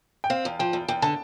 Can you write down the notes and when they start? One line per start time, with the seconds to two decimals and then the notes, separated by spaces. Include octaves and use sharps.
0.24 G5
0.30 C4 F5
0.45 E2
0.59 F3 G5
0.73 E2
0.88 E2 G5
1.02 D3 A5